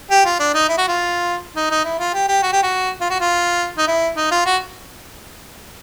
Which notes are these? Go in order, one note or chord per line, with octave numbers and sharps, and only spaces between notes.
G4
F4
D4
D#4
E4
F#4
F4
D#4
D#4
E4
F4
G4
G4
F#4
G4
F#4
F4
F#4
F4
D#4
E4
D#4
F4
F#4